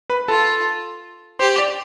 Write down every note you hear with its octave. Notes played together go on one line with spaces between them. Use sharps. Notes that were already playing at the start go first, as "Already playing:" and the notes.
B4 B5
F4 A4 A5
G4 C5 C6
D5 D6